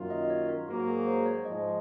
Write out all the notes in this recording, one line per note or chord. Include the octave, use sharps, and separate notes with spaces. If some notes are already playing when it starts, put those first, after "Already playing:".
Already playing: F#2 D#3 A#3 F4
D#5
C#5
A#4
G#2 F#3 A#3 F#4
G#4
C5
C#5
G#2 F3 G#3 D#5